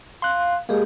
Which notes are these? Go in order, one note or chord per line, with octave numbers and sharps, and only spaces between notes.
F5 C6 F#6
G#3 A#3 G4 G#4